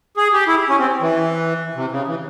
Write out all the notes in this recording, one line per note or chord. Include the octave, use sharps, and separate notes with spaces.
G#4
G4
E4
C#4
C4
E3
C3
C#3
E3